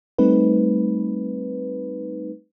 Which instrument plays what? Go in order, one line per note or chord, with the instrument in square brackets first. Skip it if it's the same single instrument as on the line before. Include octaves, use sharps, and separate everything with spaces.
[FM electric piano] G3 A3 C4 D#4 B4